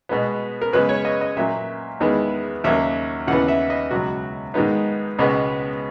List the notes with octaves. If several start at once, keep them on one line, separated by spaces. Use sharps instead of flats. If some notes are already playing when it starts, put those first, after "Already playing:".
B2 G#3 B3
A#4
F#2 C#3 G#3 B3 B4
C#5
D#5
D#5
A#2 F#3 A#3 E5
E2 D#3 G#3 B3
D#2 C#3 F#3 A#3 E5
D#2 C#3 E3 B3 F#5
E5
D#5
C#2 B2 F#3 F#4
G#2 D#3 G#3 B3 D#4
C#2 B2 G#3 B3